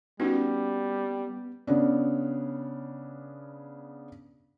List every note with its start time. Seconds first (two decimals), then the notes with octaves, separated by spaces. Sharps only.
0.20 G3 B3 C#4 D#4 F#4
1.67 C#3 B3 C#4 D4